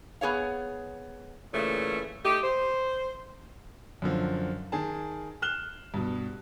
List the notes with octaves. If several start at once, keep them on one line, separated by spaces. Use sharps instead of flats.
B3 G#4 C#5 F5
A#2 C#3 E3 A3
A3 D#4 G4
C5
F#2 D3 F3
D#3 G#4 A5
F6 F#6 E7 G7
G2 B2